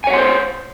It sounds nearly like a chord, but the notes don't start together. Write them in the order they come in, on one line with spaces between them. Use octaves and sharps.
G#5 C#5 F#5 C6 C5